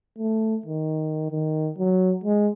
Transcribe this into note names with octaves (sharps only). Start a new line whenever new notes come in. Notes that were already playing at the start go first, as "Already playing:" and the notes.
A3
D#3
D#3
F#3
G#3